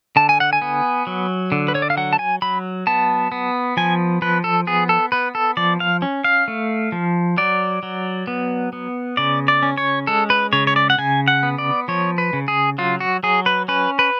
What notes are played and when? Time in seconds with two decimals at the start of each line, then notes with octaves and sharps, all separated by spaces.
0.16 D3 A5
0.29 G#5
0.40 F#5
0.53 G#5
0.62 B3
1.07 F#3
1.52 D3
1.68 B4
1.75 C#5
1.82 D5
1.90 F5
1.97 F#3 F#5
2.13 A5
2.19 G#5
2.42 F#3 B5
2.87 B3 A5
3.32 B3
3.77 F3 G#5
4.22 F3 B4
4.44 A4
4.67 B3 G#4
4.89 A4
5.12 B3 B4
5.35 A4
5.57 F3 D5
5.80 F5
6.02 C#4
6.24 F5
6.48 A3
6.92 F3
7.38 F#3 D5
7.83 F#3
8.27 B3
8.73 B3
9.17 C#3 D5
9.48 D5
9.63 C#4
9.78 C#5
10.07 G#3 A4
10.30 B4
10.53 C#3 C#5
10.67 C#5
10.76 D5
10.90 F#5
10.98 C#3 G#5
11.28 F#5
11.43 B3
11.58 D5
11.88 F3 C#5
12.18 B4
12.33 C#3
12.48 G#4
12.78 F#3 F4
13.00 F#4
13.23 F#3 G#4
13.46 B4
13.68 C#4 B4
13.99 B4